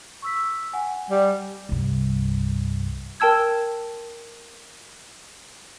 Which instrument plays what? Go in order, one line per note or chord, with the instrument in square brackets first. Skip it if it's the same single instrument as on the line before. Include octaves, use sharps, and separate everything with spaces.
[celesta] C#6 E6 B6
F#5 G#5
[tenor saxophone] G3
[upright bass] C2 G2
[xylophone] A#4 G5 A5 E6 G#6